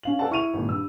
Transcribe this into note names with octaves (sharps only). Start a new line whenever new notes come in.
C#4 F5 F#7
A4 B4 D5 F#5 G#5 A5
E4 C#6 F6 D#7 F7
G#1 A#2
G2 E6